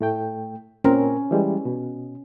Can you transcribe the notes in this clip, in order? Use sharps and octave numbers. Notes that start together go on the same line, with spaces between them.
A2 A3 G5
A#2 C4 C#4 A#4
E3 G3 G#3
B2